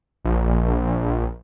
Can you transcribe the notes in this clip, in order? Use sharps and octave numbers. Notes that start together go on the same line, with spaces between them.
A#1